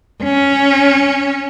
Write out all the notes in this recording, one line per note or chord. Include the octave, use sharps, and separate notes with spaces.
C#4